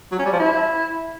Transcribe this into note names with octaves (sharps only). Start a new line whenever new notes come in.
F#3
C#4
G3
F3
E4